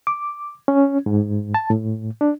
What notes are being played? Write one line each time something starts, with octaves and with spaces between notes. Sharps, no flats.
D6
C#4
G#2
A5
A2
D4